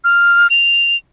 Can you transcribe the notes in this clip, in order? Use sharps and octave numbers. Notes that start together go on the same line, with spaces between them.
F6
F7